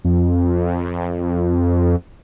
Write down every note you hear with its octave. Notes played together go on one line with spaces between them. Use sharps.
F2